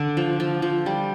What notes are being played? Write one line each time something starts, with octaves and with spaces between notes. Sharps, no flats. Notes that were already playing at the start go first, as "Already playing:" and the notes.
Already playing: D3 D4
F3
F3
F3
G3